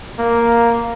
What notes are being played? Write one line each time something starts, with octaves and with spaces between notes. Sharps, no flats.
A#3